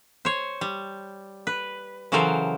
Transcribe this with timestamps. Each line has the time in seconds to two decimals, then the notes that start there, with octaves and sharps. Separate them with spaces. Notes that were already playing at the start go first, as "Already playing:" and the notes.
0.25 C5 C#5
0.61 G3
1.47 B4
2.12 C#3 E3 F#3 A4 A#4 C5